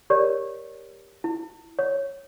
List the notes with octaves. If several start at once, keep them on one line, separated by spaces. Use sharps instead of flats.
G4 A#4 C#5 D5
E4
C#5